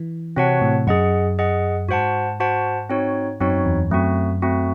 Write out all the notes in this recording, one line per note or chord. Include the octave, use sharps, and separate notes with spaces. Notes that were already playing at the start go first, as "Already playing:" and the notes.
Already playing: E3
C3 C4 F#4 C#5 F#5 A5
A2
F#2 G#4 D#5 F#5
G#4 D#5 F#5
G#2 F#4 C5 F#5 A5
F#4 C5 F#5 A5
C4 D#4 F#4 C#5
F#2 C4 D#4 F#4 C#5
E2
F#2 A3 C4 F#4
A3 C4 F#4